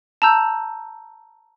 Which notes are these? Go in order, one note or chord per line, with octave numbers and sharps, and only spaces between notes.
A5 A#5 E6 G6